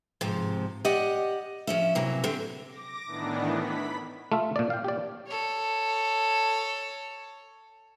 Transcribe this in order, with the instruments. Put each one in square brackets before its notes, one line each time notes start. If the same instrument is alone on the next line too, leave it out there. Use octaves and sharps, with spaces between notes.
[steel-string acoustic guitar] G#2 C3 F3
G4 D5 D#5 F#5
F3 C#4 E5
C3 E3 F#3 A#3
D2 D3 C4 G4
[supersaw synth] D6 A#6
A2 D#3 E3 B3 D4
B5 B6
[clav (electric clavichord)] A3 F4 E5
A#2 D5
F5 G5
G4 D5
[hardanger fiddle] A4 C#5